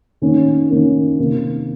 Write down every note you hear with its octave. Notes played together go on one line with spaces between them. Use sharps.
D#3 A#3 C#4
D#3 A#3 C#4
C3 D#3 A#3